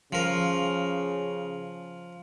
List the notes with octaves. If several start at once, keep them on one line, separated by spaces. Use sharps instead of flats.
C#3 F3 A#4